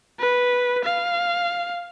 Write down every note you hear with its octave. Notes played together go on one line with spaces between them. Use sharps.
B4
F5